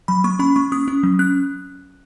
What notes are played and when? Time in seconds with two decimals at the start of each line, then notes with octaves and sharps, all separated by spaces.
0.08 F#3 B5
0.24 A#3 C#6
0.39 C#4 B5
0.56 A#3 C#6
0.72 C#4 D#6
0.88 C#4
1.03 F#3
1.19 C#4 F#6